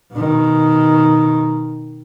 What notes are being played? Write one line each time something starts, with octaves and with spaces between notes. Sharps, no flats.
B2 D#3